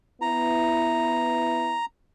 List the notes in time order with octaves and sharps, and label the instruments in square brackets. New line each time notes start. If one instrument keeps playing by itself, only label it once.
[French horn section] B3 E4 [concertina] A#5